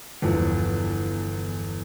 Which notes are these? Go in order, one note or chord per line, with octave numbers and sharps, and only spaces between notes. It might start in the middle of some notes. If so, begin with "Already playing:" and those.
G1 E2 F3